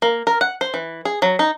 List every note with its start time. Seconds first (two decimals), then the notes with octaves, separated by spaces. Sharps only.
0.02 A#3
0.27 A#4
0.41 F#5
0.61 C5
0.74 E3
1.05 G#4
1.22 F#3
1.39 D#4